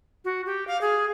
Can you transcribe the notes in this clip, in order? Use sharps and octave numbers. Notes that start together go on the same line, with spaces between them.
F#4
G4
F5
G#4